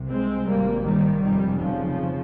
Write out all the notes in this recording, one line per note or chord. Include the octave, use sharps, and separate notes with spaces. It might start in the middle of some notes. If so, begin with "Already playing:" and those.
Already playing: C2 C3
G#3 C4
G#1 G#2 G3 A#3
D#3 G3
F1 F2 C3 D#3 G3
C#3 F3